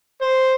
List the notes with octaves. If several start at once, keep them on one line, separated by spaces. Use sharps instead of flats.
C5